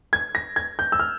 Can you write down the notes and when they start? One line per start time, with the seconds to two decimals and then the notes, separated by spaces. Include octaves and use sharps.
0.13 G#6
0.35 A#6
0.56 G#6
0.79 G6
0.92 E6
1.00 F6